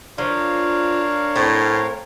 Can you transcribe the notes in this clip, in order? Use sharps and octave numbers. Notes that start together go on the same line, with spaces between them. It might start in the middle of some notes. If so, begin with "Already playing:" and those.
F3 D4 A#4 C#5 F5
A2 C4